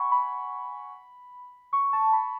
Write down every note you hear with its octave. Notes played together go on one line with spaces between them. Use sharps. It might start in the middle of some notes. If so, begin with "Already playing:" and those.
Already playing: F#5 G#5 B5 C#6
B5
C#6
A5
B5